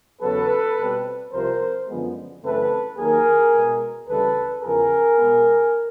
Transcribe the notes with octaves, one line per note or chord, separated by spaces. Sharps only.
E2 C#3 F#3 B3 A4 B4
B2 G3 C4
C2 C3 F3 A#4 C5
F#2 D3 F3 G#3 B3
F#2 C#3 E3 A3 C4 A4 B4
D#2 D#3 F#3 A#3 G#4 A#4
B2 G#3 B3
D2 C#3 E3 G3 A4 B4
E2 C#3 F3 G#4 A#4
B2 G#3 B3